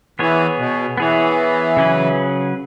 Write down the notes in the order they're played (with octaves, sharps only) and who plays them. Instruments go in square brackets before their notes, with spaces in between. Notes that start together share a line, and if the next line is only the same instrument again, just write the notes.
[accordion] E3 [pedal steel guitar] B3 G#4 C#5
[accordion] B2
[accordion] E3 [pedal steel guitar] B3 G#4 C#5
[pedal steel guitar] C#3 F#3 C#4 G#4 B4